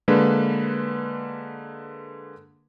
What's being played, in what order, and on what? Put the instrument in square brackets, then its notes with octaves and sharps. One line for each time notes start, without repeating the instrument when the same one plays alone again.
[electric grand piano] D3 G#3 A#3 B4